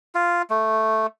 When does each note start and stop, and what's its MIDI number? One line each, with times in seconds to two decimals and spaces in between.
0.15 0.42 65
0.50 1.07 57